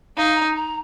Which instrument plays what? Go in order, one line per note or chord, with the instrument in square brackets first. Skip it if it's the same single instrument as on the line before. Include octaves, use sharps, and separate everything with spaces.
[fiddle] D#4 [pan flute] F5
[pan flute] A#5
A#5